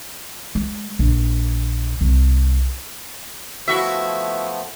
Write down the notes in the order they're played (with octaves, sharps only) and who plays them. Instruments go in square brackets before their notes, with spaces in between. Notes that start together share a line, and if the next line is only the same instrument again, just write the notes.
[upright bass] G#3
A#1
C2
[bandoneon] F3 A3 B3 [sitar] E4 F#4 E5